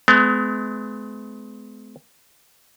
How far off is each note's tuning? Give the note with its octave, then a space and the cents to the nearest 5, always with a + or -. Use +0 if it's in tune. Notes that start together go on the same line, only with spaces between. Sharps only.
G#3 +40 B3 +45